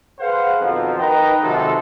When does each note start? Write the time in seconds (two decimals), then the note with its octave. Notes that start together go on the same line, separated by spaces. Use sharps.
0.20 G#4 B4 C5 F5 F#5
0.60 F2 B2 D#3 F3
0.99 D#4 A#4 B4 D#5 G5 A#5
1.42 C3 D#3 F3 F#3 G#3 A4